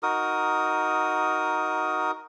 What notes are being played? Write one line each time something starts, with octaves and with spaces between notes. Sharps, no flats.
D#4 F#4 A#4 D#6